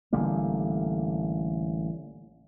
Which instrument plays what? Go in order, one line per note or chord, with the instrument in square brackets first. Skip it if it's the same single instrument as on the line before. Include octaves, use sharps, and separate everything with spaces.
[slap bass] A1 D3 G3 A#3